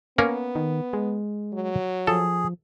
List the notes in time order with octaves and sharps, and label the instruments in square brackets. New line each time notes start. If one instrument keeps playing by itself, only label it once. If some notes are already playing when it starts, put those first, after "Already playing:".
[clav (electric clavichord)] A#3 C#4 A#4 [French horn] B3
[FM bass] D#3
G#3
[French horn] F#3
[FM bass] F3 [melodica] G#4 [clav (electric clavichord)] A4